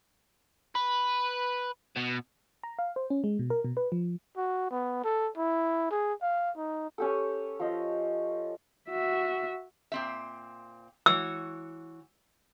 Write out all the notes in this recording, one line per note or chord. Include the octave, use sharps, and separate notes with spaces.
B4
B2
A#5
F5
C5
C#4
G#3
B2
A#4
B2
B4
F3
F#4
B3
A4
E4
G#4
F5
D#4
C#4 G4 A4
F3 D#5
F#4 E5
A#2 C4 E5
E3 F#4 C#5 E6